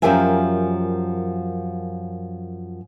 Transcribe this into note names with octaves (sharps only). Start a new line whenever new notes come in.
F#2 F3 G4 A#4 E5 G#5